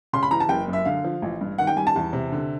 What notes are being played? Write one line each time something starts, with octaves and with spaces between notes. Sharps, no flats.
C#3 C6
B5
E3 A#5
A5
F#1 G5
F#2
E5
D3 F5
F3
A1
G2
D#3 F#5
G5
G3 G#5
A5
E2
C3
D3